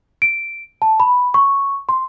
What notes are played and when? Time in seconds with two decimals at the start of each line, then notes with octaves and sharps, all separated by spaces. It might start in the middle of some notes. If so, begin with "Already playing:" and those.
0.22 D7
0.82 A5
1.00 B5
1.34 C#6
1.89 C6